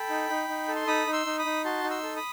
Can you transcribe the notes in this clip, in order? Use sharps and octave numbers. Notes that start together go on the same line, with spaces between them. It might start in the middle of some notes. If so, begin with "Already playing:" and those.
Already playing: A4 G5 B5
D#4
D#4
D#4
A4
C6
D#4 B5 D#6
D#4
C6 E6
D#4
B5 D#6
D#4
F#4 A5 C6
D#4
C6 E6
A4
B5 D#6